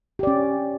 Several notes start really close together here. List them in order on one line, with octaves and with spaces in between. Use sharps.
G4 D5 C#4